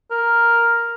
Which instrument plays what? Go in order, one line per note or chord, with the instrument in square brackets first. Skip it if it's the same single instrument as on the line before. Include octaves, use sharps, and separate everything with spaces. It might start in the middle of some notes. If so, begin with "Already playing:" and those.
[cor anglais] A#4